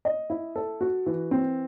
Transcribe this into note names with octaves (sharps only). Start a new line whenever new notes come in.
D#5
E4
A4
F#4
E3
C4